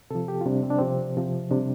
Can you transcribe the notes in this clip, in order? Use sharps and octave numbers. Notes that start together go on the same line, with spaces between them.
C3 F3 A4
G4
F4
C3 G3 D4
C4
D4
C3 F3 C4
C3 F3
C3 G3 D4